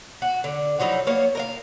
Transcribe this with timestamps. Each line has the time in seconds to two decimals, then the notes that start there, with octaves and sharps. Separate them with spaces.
0.22 F#4
0.44 D3
0.79 F3 F#3 D#4 E4
1.07 A#3 B3 C#5
1.35 A#4 D#5 F5